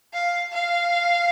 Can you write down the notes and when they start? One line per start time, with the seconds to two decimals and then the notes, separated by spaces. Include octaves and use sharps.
0.13 F5
0.53 F5